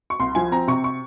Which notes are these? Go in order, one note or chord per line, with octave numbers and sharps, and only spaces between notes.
C#6
C2 C6
F3 G#5
C4 A#5
C3 C#6
C#6